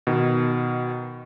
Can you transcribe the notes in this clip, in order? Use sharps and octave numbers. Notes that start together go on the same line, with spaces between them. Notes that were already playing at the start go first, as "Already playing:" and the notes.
B2 D#3